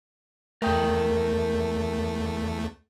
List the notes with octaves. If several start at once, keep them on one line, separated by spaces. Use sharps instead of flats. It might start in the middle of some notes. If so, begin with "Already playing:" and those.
E2 A3 A#4 G5